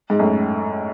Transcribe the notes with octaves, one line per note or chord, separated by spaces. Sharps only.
G#2
F#2 A2